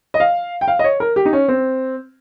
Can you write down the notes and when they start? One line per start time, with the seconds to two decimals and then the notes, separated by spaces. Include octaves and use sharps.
0.14 D#5
0.20 F5
0.61 G5
0.68 F5
0.79 D#5
0.84 C#5
1.00 A#4
1.16 G4
1.25 D#4
1.33 C#4
1.48 C4